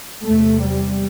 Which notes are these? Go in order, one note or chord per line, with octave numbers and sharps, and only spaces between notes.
E2 C3 A3
G3